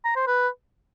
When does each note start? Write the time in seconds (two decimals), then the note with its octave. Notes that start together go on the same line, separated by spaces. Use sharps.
0.05 A#5
0.16 C5
0.27 B4